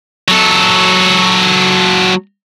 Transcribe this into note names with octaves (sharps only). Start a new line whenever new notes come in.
F#3 A4